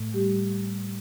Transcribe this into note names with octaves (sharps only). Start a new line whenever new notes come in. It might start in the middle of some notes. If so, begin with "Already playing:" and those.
Already playing: A2 A3
G3 G4